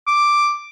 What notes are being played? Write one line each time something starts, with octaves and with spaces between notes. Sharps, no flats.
D6